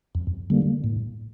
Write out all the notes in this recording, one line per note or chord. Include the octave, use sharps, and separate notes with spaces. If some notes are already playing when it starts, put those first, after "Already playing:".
F2
D3 G3 A#3
A2